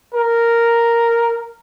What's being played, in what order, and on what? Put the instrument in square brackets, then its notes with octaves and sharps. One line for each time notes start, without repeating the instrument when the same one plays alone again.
[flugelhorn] A#4